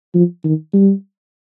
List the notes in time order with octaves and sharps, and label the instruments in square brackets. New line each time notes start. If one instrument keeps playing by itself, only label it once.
[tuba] F3
D#3
G3